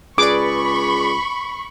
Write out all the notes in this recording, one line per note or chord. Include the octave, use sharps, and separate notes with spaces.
C#2 G#4 B4 D5 B5 C#6 D6